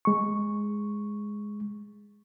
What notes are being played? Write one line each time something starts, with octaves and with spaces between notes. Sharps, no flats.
G#3 C#6